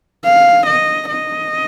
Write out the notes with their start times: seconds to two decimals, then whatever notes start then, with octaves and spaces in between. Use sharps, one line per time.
0.24 F5
0.67 D#5
1.09 D#5